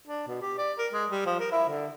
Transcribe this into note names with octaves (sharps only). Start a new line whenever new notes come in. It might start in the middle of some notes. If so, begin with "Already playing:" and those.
D4
B2
G4
D5
A#4
G#3
G3
F3
A#4
E4
D3